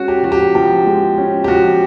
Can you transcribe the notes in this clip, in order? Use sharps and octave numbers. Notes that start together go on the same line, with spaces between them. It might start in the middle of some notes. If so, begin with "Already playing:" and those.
Already playing: G#3 C#4 F#4
G4
F3 F#4
G4
F3 G4
G#3
C#4
G4
F3 F#4